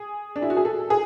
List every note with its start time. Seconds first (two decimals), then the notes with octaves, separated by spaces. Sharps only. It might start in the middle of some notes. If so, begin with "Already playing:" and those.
Already playing: G#4
0.36 D4
0.42 E4
0.50 F#4
0.57 G#4
0.65 A4
0.90 G#4